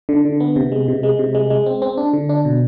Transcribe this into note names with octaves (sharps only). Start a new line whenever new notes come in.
D3
D3
B3
C3
G#3
C3
G#3
C3
G#3
G#3
C4
C4
D4
D3
D4
B2